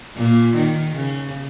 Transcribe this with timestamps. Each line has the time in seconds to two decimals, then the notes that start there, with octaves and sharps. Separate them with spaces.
0.16 A#2
0.55 D#3
0.97 C#3